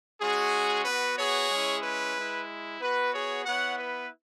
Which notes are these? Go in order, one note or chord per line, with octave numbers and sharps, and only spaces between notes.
G#3 C#4 F#4 G#4
B3 F#4 B4
G#4 C#5
G#3 C#4 E4
B4
G#3 E4
B3 F#4 B4
G#4 C#5
B3 E4 C#5 F#5
B4